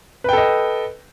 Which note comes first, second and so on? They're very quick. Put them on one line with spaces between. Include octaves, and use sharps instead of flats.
B4 G5 A4 D#5